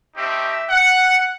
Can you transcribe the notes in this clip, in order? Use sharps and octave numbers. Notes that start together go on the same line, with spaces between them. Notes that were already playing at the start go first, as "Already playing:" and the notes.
A3 C4 D#4 G4 E5
F#5